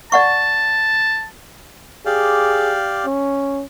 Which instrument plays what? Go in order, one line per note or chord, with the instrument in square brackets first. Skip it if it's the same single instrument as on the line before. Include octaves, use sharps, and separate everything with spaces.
[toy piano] D5 F#5 C#6 [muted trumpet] A5
[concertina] G4 D5 F5 [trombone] G#4
[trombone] C#4